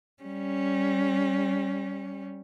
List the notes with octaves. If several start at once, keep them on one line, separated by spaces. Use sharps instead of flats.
G3 C#4